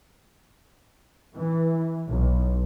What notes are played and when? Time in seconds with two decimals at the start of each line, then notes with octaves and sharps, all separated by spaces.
1.34 E3
2.08 B1